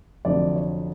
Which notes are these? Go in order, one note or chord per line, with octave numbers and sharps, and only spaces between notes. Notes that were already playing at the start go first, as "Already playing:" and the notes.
F1 F2 D3 F#3 D5
C#5